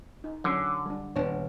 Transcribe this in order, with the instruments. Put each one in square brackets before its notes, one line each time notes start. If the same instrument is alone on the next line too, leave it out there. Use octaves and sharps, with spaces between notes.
[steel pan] D#4
[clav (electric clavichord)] D3 [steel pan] F#3 C#4
[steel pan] G3 D4
[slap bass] D#1 [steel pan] B3 D4 C#5